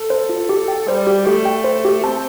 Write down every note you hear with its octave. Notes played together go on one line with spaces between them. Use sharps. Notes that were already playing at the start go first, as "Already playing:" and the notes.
Already playing: A4
C5
F4
G4
G5
G3 C5
G4
A3 G4
G5
C5
G4
C4 A5